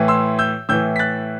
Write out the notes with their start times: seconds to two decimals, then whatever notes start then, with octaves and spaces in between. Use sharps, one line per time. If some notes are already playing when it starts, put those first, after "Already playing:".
Already playing: A2 E3
0.08 C6 E6
0.39 E6 G6
0.69 A2 E3 E6 G6
0.96 B6
0.99 F#6 A6